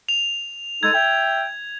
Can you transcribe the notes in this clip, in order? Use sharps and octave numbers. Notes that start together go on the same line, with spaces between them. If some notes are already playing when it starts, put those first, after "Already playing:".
F7
G#3 D#4 A4 G#6
E5 G5